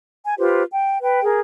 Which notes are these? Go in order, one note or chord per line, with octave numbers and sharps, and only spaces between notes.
G#5
F4 G4 B4 C5
G5
B4 G5
G#4 A#4